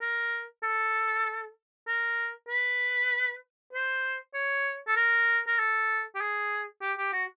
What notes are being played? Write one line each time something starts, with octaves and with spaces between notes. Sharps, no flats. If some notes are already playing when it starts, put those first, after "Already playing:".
A#4
A4
A#4
B4
C5
C#5
A4
A#4
A#4
A4
G4
G#4
G4
G4
F#4